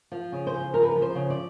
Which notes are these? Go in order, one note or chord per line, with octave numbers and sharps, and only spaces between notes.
F3
C#3
C5
C#3
F3 A#4
B4
F3 A#4
C5
C#3
D5